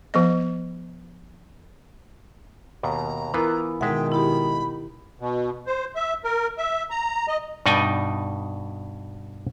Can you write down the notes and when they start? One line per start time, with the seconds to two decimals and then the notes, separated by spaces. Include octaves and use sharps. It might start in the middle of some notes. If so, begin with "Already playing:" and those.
0.14 F3 B3 D#5
2.83 D#2 B2 A#5
3.34 E3 B3 E4 F4 A#4
3.81 B2 D#3 G#3 E5 F#5 G5
4.12 E4 G4 B5
5.20 B2
5.67 C5
5.95 E5
6.24 A#4
6.58 E5
6.91 A#5
7.28 D#5
7.66 G2 B2 D#4 D5 G5 G#5